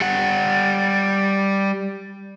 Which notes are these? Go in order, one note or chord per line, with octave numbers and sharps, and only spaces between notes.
G3 F#5